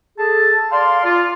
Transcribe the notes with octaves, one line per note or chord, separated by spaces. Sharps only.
G#4 A4 A5
D5 F5 C6
F4